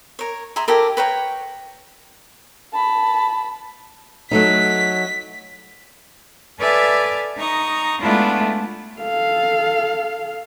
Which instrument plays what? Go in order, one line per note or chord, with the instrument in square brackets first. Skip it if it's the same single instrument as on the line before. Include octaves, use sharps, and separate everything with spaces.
[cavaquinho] A#4 C#5
G#4 E5 A#5 C6
E4 G4 A4 A#4
B4 C#5 G5 A#5
[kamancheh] A5 B5
[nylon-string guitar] F#3 A3 D#4 [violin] B6
[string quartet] A4 B4 D5 E5 G#5 F6
D#4 A#5 C#6 D#6
G#3 A3 B3 D4 E4 F4
[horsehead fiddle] A4 F5